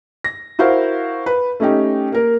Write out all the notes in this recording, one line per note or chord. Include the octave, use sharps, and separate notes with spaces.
A#6
E4 F#4 A#4 C5 F5
B4
A3 C#4 D#4 G4
A#3 A#4